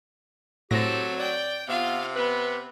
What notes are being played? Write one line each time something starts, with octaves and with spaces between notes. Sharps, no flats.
A2 F#3 C4 G4 A4 A#6
D5 G5
C3 B3 F4 F5
B3 B4